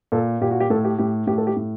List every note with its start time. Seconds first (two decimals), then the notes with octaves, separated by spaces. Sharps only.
0.12 A#2 A4
0.41 A#2 G4
0.51 F#4
0.60 G4
0.70 A2 A4
0.85 G4
0.98 A2 G4
1.27 A2 G4
1.38 A4
1.47 G4
1.56 A2